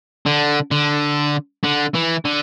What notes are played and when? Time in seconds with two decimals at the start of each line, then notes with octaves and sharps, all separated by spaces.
0.26 D3
0.71 D3
1.64 D3
1.95 E3
2.25 D3